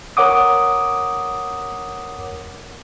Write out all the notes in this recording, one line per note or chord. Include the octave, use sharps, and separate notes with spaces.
A#4 C#5 F#5 D6 D#6